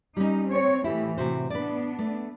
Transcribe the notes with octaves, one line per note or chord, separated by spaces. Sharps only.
G3 C#4 D#4
C4 C#5
A2 E3 A3 E4 G4
C3 F#4 C5
B3 D4 B4 D5
A3